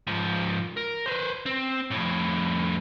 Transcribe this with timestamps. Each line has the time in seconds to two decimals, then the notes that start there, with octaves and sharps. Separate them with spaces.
0.07 G#2 F3
0.77 A#4
1.06 B4 C5
1.46 C4
1.91 F2 A2